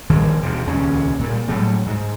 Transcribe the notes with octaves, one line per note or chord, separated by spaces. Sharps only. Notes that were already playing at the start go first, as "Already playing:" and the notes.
A#1 D#3 G3 G#3
E1 D#2 C3
D#1 C#2 A#2 C#4
A#2 G3
A2 F#3 G3 A3
G#2